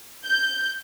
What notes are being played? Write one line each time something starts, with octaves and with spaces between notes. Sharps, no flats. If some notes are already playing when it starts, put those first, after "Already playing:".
G6